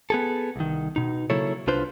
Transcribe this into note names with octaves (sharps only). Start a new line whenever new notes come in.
B3 G#4 A4
C2 D#3
B2 D#4
C#3 F#3 A#3 E4 A4 C#5
C2 D4 F4 B4 C5